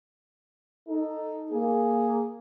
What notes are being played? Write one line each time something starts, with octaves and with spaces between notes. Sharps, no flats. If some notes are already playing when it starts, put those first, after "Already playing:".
D#4 A4
A#3 G#4